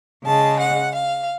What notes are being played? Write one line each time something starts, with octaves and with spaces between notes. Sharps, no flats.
C#3 G#3 A5
F#5
F5